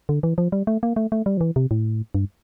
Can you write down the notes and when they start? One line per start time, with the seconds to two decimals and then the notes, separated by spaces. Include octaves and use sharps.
0.09 D3
0.23 E3
0.38 F3
0.52 G3
0.67 A3
0.83 A#3
0.96 A3
1.12 A3
1.26 G3
1.37 F3
1.41 E3
1.56 C3
1.71 A2
2.15 G2